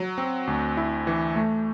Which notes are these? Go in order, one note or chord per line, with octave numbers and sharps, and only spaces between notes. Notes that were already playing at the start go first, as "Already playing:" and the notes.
Already playing: F#3
C4
D2
E4
E3
A3